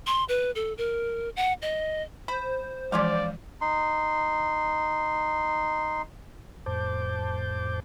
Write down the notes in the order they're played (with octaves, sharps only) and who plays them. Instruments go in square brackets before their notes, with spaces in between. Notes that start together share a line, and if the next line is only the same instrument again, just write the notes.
[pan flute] C6
B4
A4
A#4
F#5
D#5
[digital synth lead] C5 [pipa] B5
[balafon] E3 F3 G#3 [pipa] C#4 F4 F5 [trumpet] D5
[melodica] D#4 C6
[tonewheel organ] F2 A2 C5 A5 D6 G6